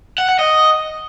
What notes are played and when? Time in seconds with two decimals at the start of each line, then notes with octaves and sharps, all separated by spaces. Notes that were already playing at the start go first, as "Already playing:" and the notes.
0.18 F#5
0.29 F#5
0.39 D#5